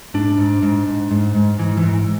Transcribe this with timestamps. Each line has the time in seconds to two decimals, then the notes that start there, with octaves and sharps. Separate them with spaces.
0.14 G#2 D4
0.38 G#2
0.62 G#2
0.87 G#2
1.11 G#2
1.35 G#2
1.59 G#2 E3
1.77 E3
1.83 G#2